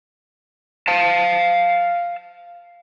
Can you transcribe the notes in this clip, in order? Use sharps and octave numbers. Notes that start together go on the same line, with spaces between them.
F5 A5